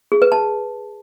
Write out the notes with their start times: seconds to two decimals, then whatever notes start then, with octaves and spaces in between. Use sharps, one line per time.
0.12 G#4
0.22 B4
0.32 A5